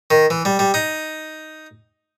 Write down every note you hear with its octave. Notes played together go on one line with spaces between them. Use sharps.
D#3
E3
G3
G3
D#4